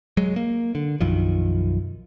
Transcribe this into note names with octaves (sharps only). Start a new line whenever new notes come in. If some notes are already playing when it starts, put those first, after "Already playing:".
F#3 G#3
A#3
D3
B1 F#2 D#3 F3